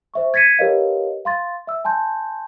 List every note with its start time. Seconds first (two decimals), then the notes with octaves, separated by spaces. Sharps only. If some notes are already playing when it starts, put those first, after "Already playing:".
0.14 C5 E5 C#6
0.34 G#6 A6 B6 C#7 D#7
0.59 G4 A#4 B4 C#5 D#5 F5
1.25 F5 C6 A6
1.67 E5 E6
1.85 G#5 A5 C6 G6